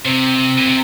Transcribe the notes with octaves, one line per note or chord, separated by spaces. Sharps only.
C3 C4
A#2
C3